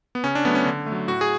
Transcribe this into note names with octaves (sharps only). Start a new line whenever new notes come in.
B3
C#3 C#4
D4
F#3 A3 B3
C#4
D3
A3
F#3
A2 F#4
G#4